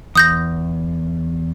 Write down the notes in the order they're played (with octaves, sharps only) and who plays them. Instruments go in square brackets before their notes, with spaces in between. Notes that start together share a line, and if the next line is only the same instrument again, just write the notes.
[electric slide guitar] E2 [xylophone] D#6 G6 A#6